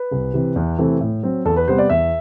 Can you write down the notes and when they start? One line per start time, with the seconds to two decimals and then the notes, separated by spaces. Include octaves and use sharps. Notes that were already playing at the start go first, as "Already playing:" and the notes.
Already playing: B4
0.11 C2
0.34 C3 E3
0.56 E2
0.78 C3 E3 A3 C4
1.01 A2
1.23 F#3 C4
1.45 E2 A4
1.56 B4
1.68 C3 G3 B3 C5
1.78 D5
1.90 E2 E5